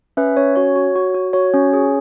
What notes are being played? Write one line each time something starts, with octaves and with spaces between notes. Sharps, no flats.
C#4 B4 E5
C#4 C#5
F#4 C#5
F#4
F#4
F#4
F#4 C#5
C#4
G#4